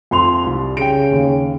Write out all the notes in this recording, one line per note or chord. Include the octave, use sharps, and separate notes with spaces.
F2 C6 F7
C2 G3
C#3 G5 D7
D#2